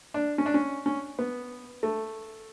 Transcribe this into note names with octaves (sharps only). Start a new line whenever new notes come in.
D4
C#4
D4
C#4
C#4
B3
A3